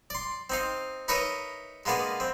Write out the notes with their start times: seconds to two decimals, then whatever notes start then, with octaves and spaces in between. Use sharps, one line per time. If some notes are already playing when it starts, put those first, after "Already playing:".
0.10 D5 C6
0.50 C4 D#4 F5
1.08 D#4 A#4 B4 C#5 D#5 E5
1.85 G#3 A#3 B3 D4 F5
2.20 C4